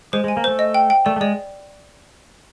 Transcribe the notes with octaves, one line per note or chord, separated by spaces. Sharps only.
G#3 C5
G#3
G#5
A#3
A3 C5
D#5
G5
G5
A3 D5
A3
G#3 D5